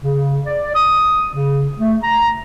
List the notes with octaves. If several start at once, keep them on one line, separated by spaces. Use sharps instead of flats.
C#3
D5
D#6
C#3
A3
A#5